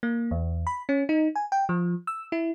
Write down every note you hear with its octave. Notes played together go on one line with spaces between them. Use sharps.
A#3
E2
B5
C#4
D#4
G#5
G5
F3
E6
E4